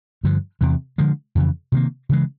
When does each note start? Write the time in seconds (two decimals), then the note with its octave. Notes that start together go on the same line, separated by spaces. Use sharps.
0.24 G2 D3 F3
0.61 E2 C3 E3
0.98 D3 F3 G#3
1.35 F2 C#3 E3
1.72 C3 D#3 G3 A#3
2.09 C#3 E3 G#3